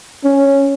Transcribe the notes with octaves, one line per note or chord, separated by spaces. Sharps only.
C#4